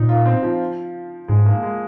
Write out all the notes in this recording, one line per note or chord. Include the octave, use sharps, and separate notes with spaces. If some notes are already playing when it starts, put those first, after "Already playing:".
Already playing: A#2 D#4
F4
C4
F3
G#2 G#3
A#3
G#3